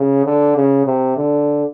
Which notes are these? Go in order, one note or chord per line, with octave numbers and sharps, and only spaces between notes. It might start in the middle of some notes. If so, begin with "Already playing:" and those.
Already playing: C#3
D3
C#3
C3
D3